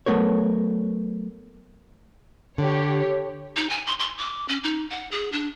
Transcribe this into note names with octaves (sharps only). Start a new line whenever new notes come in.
F#3 A3 B3 A#4 C#5
D3 G4 C#5
D#4
G#5
C6
C6
D6
C#4
D#4
F#5
G#4
D4